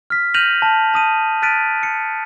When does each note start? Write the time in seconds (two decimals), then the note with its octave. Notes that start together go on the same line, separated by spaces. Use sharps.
0.10 F6 B6
0.34 F6 G6 A#6 D#7 F7 F#7
0.62 A5
0.94 A5 D#6 D#7
1.42 F6 F#6 A6 B6 D7 D#7
1.83 C#7